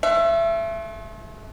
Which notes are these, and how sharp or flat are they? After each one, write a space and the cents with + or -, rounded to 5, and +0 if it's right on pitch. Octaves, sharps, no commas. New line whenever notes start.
A3 -40 E5 +25